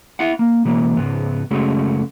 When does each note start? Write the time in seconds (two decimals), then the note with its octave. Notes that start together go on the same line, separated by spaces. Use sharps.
0.19 E4 E5 F#5
0.39 A#3
0.65 B2 E3 G#3 A#3
0.97 C#2 G#2 B3
1.51 F#2 C#3 G#3 A3 F#4